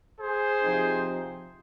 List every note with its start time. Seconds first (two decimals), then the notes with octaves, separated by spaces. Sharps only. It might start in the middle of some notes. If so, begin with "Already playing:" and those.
0.19 G#4 C5
0.62 C3 F3 C4 D#4